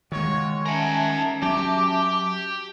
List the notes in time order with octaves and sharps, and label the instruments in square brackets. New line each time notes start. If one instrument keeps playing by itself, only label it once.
[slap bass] D#3 G#3 [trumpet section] F4 F#4 C#5
[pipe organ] C#4 E5 A5 [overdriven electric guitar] A#4 F#5 [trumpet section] G#5
[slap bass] F#3 [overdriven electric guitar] G4 [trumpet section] D6